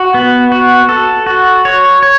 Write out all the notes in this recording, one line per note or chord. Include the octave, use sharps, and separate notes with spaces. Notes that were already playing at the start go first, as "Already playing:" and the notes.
Already playing: F#4
B3
F#4
A4
F#4
C#5
C#5